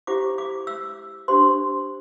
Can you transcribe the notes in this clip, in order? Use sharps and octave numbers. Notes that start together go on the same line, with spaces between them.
E4 G4 C5 D6
D6
E6
D4 G4 C5 C6